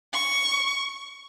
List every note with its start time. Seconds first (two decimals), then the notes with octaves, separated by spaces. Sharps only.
0.13 C#6